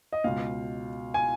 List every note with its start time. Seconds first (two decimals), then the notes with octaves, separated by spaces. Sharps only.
0.13 D#5
0.24 C#2 B2 F5
1.14 G#5